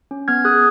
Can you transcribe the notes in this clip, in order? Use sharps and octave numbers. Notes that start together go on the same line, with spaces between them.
C#4
B3 F6 G#6
G#4 D#6 F#6